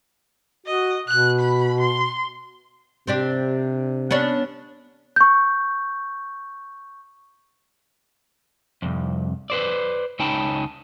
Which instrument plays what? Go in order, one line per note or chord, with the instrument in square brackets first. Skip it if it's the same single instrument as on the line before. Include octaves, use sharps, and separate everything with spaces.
[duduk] F#4 [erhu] D#5
[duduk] B2 [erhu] F#6
[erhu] B5
C6
[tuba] C3 [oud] C4 D4 G4
[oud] B3 C#4 D4
[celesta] C#6 G6
[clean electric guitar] C2 F2
B4 C5 D5
C#2 C#4 D#4 G5 A5 B5